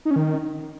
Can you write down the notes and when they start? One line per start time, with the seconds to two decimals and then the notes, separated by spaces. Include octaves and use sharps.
0.05 D#4
0.11 C#4
0.16 D#3